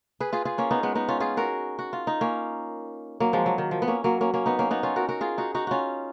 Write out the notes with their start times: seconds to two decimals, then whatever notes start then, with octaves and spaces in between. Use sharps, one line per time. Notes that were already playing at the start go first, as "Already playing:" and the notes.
0.20 G#4 B4
0.33 F4 G#4
0.45 F4 G#4
0.58 A#3 C#4
0.71 B3 D#4
0.83 G#3 B3
0.95 B3 D#4
1.08 C#4 F4
1.20 F4 G#4
1.37 F#4 A#4
1.79 F#4
1.93 F4
2.07 D#4
2.21 A#3 C#4
3.20 F#3 A#3
3.33 F3 G#3
3.46 F#3
3.58 D#3
3.71 F3
3.82 B3
3.88 A#3 C#4
4.04 F#3 A#3
4.21 A#3 C#4
4.34 A#3 C#4
4.46 B3 D#4
4.59 A#3 C#4
4.71 B3 D#4
4.83 C#4 F4
4.96 F#4 A#4
5.09 F#4 A#4
5.21 F4 G#4
5.38 D#4 F#4
5.55 D#4 F#4
5.67 C#4 F4 F#4